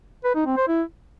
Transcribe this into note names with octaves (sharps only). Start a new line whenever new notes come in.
B4
D#4
C4
C5
E4